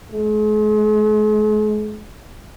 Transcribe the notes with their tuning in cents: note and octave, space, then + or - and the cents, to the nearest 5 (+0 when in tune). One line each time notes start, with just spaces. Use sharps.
G#3 +40